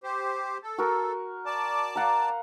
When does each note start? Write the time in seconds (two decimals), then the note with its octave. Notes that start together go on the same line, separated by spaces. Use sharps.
0.04 G4 C5
0.63 A4
0.78 F#4 A#4
1.46 D5 A5 D6
1.96 F5 F#5 A#5